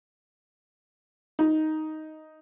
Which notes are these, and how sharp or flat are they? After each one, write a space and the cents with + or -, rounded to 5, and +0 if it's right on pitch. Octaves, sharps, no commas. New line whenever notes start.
D#4 +5